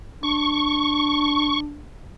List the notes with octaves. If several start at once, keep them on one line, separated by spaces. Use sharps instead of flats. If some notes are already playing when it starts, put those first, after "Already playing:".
D4 C#6